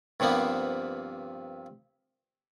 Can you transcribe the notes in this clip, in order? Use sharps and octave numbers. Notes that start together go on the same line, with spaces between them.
G2 C3 F3 A#3 B3